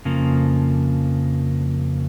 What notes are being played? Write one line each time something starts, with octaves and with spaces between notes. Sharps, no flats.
F2 C#3 F3 A#3